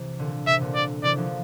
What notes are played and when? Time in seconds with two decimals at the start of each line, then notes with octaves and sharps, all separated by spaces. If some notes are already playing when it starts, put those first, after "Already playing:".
Already playing: C3 E3
0.19 A#2 D3
0.47 C3 E5
0.60 A#2 D3
0.75 D5
1.03 C3 E3 D5
1.17 D3 F3